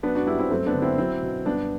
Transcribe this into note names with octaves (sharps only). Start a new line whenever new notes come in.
F#3 B3 D4
D4 F#4
G2 E4 G4
C4 E4
F#2 A3 C4
B3 D4
D3
C4 E4
F#3 C4 E4
B2
G2 B3 D4